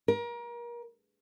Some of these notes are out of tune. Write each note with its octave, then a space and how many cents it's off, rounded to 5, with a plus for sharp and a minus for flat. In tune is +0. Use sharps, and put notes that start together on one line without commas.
A#4 +30